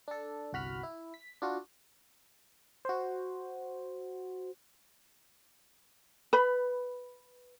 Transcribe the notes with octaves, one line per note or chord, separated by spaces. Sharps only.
D4 A4
G1 C2 F#4 B5 F6
E4
B6
D4 F4 F#4
F#4 C5
B4 B5